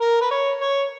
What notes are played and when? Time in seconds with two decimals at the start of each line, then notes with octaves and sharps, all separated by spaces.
0.01 A#4
0.21 B4
0.31 C#5
0.61 C#5